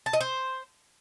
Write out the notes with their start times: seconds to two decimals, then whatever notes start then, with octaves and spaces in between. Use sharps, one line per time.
0.06 A5
0.13 D#5
0.21 C5